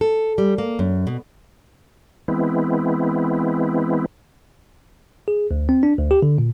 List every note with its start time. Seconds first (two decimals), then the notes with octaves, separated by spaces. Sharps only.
0.01 A4
0.38 G3
0.58 A#3
0.79 F#2
1.07 B2
2.28 E3 G#3 B3 C4 E4
5.28 G#4
5.51 D2
5.69 C4
5.83 D4
5.98 D2
6.11 G4
6.22 D3
6.38 A#2